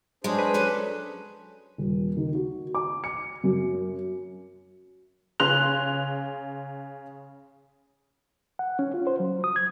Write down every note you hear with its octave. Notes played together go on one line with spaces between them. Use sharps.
F#3 G#3 D4 G#4 C5
B4
F#3 C#4 A4
D#1
D#3
F#4
D6
C#7
F#2
C#3 C6 F#6 F7
F#5
C#4
F4
C5
F#3
D#6
G#6